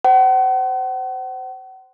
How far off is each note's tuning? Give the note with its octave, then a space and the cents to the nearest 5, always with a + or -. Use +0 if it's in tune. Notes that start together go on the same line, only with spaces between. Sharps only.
C5 -15 F#5 +40